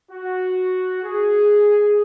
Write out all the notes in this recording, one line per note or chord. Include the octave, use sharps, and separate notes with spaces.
F#4
G#4